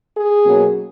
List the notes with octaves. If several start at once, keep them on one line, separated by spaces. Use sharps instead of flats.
G#4
B2 F#3 A#3 C#4